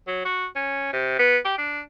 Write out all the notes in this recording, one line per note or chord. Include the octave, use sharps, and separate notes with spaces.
F#3
F#4
C#4
C3
B3
G4
D4